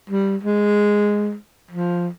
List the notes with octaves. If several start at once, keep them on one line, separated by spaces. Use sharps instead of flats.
G3
G#3
F3